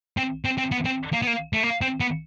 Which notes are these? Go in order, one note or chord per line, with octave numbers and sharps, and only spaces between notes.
C4
C4
C4
B3
C4
A#3
B3
A#3
A3
A#3
C4
B3